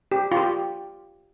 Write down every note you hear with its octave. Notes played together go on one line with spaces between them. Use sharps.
G4
F4
G4